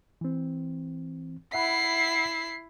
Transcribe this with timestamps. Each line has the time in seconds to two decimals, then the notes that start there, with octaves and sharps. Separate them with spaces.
0.21 E3 C4
1.53 E4 E5 F#5 B5 C7